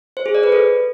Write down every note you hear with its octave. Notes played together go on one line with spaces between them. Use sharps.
C5
G#4
D5
B4
A4